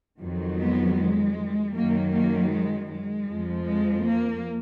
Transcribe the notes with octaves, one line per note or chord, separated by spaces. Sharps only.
F2 D#3 F#3
G#3 B3
G#3
F#2 D#3 F#3 A#3
A#3
G#3
G#3
F2 F3
G#3
A#3